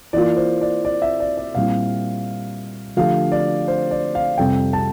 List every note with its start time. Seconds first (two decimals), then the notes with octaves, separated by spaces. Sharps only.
0.13 E3 A#3 F4 D5
0.37 C5
0.61 D5
0.85 D5
1.02 E5
1.20 D5
1.37 D5
1.55 A#2 G3 C4 E4 F5
2.97 D3 F3 A3 D4 G4 F5
3.32 D5
3.68 C5
3.91 D5
4.15 F5
4.38 F2 C3 G3 G5
4.73 A5